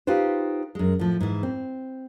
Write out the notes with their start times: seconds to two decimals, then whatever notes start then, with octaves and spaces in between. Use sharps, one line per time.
0.07 D#4 F4 G4 B4 C5
0.75 F#2 G#3
0.99 A2 F3
1.21 G#2 E3
1.43 C4